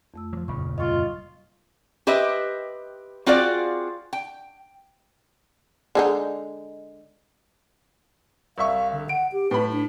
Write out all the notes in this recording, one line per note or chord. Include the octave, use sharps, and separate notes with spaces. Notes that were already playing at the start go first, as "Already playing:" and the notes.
F2 A3 E6
F3 F#3
F#1 D#2 A#2 C#3 B5 C#6
C3 G3 F4 D#5 C#6 A6
G4 B4 C5 D#5 E5
C4 F4 F#4 G#4 D5 F5
G5
D3 G#3 D#4
C2 E5 F5 C#6
D3
F#5 D7
G4
A2 B4 B5
D4